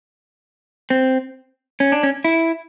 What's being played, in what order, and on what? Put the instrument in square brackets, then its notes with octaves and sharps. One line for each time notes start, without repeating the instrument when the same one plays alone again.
[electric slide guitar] C4
C#4
D4
C#4
E4